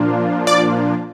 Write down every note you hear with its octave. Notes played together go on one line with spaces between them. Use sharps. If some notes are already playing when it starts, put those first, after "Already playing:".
Already playing: A#2 F3 A#3 D4 F4
D5 D6